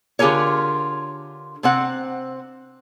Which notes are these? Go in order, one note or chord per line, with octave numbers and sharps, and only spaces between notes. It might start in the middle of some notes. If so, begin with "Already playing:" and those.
D3 F4 G4 G#4 A#4 C#5
C3 C4 F#5